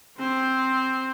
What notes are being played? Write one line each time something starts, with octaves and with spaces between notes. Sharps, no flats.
C4 C5